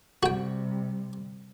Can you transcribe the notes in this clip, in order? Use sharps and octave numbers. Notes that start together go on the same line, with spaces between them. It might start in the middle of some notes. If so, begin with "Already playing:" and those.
C3 G3 F#4 G5